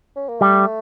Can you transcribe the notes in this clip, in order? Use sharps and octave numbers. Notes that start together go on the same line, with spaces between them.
C#4
A#3
G3 A3